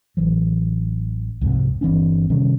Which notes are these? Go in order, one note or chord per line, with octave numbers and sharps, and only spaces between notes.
A1 E3 F#3
C2 F2 G#2 C3
G1 E3 C4 D4
C3 D#3 G3 C#4